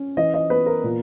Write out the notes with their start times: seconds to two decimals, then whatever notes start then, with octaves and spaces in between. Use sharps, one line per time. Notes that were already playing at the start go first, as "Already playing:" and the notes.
Already playing: C#4
0.17 E3 D#5
0.34 D#5
0.50 B3 B4
0.66 A#4
0.83 A#2